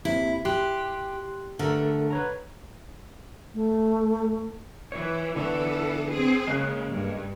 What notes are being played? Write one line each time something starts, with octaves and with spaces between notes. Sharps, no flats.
D#2 C3 E4
G4 C6 F#6
D3 A3 A4 A#4
B4 C#5 A#5
A3
E3 C#5
D3 E3 B3 A4 C#5
C4 G#4
C#3 G#3 A#3 F#6
G2